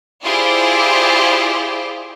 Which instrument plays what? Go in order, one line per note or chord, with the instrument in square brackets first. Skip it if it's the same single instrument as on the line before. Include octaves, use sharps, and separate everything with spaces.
[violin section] E4 F4 G4 G#4 C5 D5